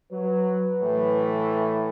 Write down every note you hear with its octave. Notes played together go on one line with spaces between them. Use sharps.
F#3 B4
A2 E3 A3